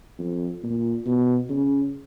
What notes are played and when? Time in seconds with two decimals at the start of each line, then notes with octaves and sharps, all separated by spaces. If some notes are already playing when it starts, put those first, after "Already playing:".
0.19 F2
0.63 A#2
1.06 B2
1.49 C#3